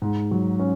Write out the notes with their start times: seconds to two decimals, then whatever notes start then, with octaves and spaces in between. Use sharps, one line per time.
0.02 G#2
0.31 F#3
0.59 C#4